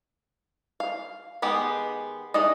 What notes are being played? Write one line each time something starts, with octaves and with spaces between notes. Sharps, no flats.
F5
D#3 G#3 B3 G4 G#4
E3 D4 D#4 D#5